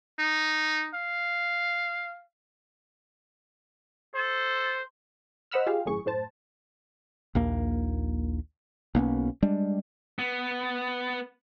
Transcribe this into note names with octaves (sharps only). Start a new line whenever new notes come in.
D#4
F5
A4 C5
C5 D#5 F#5 B5 E6 F6
F4 G4 G#4 F5
G#1 F#2 A2 G#4 C#6
F#2 A2 C5 A5
A#1 D#2 A#3
B1 A#3 B3 C#4
G3 G#3 D4
B3